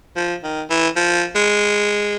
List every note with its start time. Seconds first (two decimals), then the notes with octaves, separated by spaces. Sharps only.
0.16 F3
0.43 D#3
0.70 E3
0.96 F3
1.35 G#3